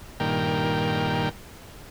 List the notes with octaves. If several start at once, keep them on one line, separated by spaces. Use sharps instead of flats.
G2 A#2 D#3 A#4 G5